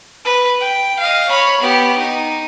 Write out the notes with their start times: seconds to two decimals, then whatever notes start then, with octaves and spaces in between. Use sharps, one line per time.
0.25 B4
0.61 G5
0.99 D#5 F5
1.29 C#5 B5
1.61 B3 G4
1.98 D#4